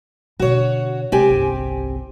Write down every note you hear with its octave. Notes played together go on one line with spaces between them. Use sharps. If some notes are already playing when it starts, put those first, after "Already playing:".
B2 D3 F#4 C#5
C3 G#3 C4 G4 G#5
G1 C2